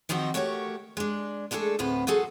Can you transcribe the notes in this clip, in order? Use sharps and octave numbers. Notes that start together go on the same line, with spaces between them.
D#3 F3 C4 D#4 F#4
A3 F#4 G4 A#4 C#5
G#3 D4
G#3 A3 D4 G#4 A4
D2 A2 B3 C4 B4
F#3 F4 F#4 G#4 A4